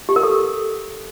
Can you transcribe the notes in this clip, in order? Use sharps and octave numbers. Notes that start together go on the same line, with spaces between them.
G4
A#4
A4